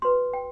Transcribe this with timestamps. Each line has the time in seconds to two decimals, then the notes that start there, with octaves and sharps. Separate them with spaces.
0.02 F#4 B4 C6
0.33 G5